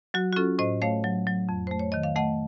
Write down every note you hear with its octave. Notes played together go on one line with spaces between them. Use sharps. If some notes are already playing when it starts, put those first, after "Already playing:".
F#3 F#4
F#4
C#4 F4 A4
A2 C5 D#5
A3 C#5 F5
F#3
F#3
F2
A3 C5
C#5
D#3 D#5
F5
A3 D#5 F#5